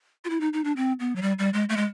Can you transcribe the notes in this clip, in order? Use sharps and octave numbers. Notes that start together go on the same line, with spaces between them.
F4
E4
D#4
D#4
D4
C4
B3
F#3
G3
G3
G#3
A3
G#3